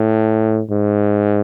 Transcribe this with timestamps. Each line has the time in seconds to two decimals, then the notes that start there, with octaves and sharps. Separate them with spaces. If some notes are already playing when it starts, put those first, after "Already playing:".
Already playing: A2
0.70 G#2